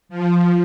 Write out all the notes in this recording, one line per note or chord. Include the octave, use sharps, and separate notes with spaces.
F3